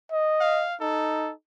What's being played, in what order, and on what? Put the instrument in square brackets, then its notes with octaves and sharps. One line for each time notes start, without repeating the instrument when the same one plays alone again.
[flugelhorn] D#5
[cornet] F5
[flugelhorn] D#4 [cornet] A4